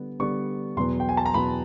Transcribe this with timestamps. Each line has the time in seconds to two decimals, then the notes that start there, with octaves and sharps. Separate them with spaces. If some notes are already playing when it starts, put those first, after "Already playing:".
Already playing: D3 G3 B3
0.20 D3 G3 B3 C#6
0.76 E2 B2 F#3 B3 C6
1.00 G5
1.09 G#5
1.17 A5
1.26 A#5
1.34 E2 B2 F#3 B3 B5